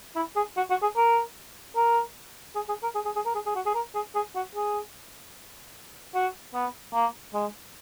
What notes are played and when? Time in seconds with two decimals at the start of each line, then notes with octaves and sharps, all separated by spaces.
0.16 E4
0.36 G#4
0.57 F#4
0.70 F#4
0.82 G#4
0.96 A#4
1.76 A#4
2.55 G#4
2.68 G#4
2.83 A#4
2.95 G#4
3.05 G#4
3.15 G#4
3.25 A#4
3.35 G#4
3.46 G#4
3.55 F#4
3.66 G#4
3.74 A#4
3.94 G#4
4.15 G#4
4.35 F#4
4.55 G#4
6.14 F#4
6.54 B3
6.93 A#3
7.34 G#3